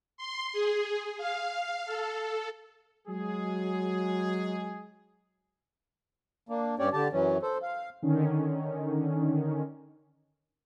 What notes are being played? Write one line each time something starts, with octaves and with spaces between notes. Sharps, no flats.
C6
G#4
F5
A4
F#3 G#3 G#4
A#3 D4
G2 C#4 G4 C#5 D5
D3 G4 A5
F#2 E3 F#3 C#4
A4 C5
F5
D3 D#3 C#4